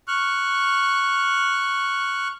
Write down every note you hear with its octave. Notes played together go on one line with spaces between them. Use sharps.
C#6 F6 F#6